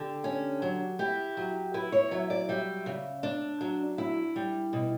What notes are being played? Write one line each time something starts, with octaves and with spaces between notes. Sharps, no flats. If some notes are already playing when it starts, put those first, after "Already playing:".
Already playing: D3 G4
C#4
F#3
E4 G4
F#3
E4 B4
C#5
F#3 E5
D5
G3 E5
C#3
D4
F#3
E4
G3
B2